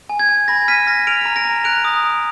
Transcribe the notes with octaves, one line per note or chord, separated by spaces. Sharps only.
G#5
G#6
G#5
B5 A#6
F6 B6 D#7
F6 A#6
F6 D7 F7
A#5
A#6 D7
A#5
F#6 D7 F7
D#6
D#6